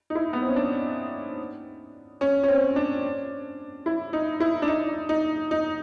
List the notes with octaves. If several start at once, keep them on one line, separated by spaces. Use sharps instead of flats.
D#4
E4
B3
C4
C#4
D4
C#4
C#4
C4
D4
E4
D#4
E4
D4
D#4
D#4
D#4